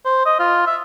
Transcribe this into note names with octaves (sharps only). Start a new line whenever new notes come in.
C5
D#5
F4
E5